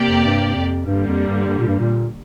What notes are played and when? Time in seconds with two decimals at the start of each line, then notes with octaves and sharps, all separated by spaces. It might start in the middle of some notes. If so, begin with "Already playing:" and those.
Already playing: C3 A#3 G4 D5
0.09 F2
0.25 G2
0.56 F2
0.86 G2 D3 G3 A#3
1.07 F2
1.28 G2
1.48 G2
1.58 A#2
1.68 G2
1.79 A#2